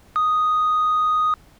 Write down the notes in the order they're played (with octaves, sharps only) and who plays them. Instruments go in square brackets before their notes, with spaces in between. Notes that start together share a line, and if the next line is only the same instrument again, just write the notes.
[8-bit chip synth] D#6